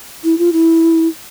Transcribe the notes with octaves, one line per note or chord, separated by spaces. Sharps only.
E4
F4
E4